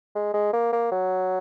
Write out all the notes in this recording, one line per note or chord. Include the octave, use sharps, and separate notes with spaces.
G#3
G#3
A#3
A#3
F#3